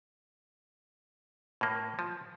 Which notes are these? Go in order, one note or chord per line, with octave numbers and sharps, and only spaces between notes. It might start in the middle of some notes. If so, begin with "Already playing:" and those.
A2 A#3
F3